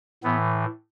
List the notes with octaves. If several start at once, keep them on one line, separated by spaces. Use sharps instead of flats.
A2 E3 B3